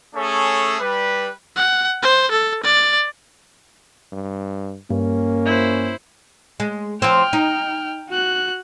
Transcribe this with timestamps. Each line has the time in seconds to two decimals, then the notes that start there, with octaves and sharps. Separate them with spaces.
0.15 A3 C#4 G#4 A4 C#5
0.80 G3 B4
1.56 F#5
2.02 C5
2.31 A4
2.63 D5
4.12 G2
4.90 G2 A#3 C#4
5.45 E4 C5
6.60 G#3
7.02 F3 C4 G5 F6
7.33 D#4
8.09 F#4 F#6